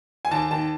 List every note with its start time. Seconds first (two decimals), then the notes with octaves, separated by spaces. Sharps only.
0.25 G#5
0.31 D#2 A5
0.51 D#3 A5